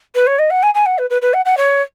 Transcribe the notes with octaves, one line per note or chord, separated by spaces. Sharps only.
B4
C#5
D#5
F#5
G#5
G#5
F#5
B4
B4
B4
F#5
F#5
C#5